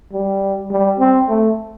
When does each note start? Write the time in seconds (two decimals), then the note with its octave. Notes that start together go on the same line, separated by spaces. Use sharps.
0.13 G3
0.70 G3
0.99 C4
1.28 A3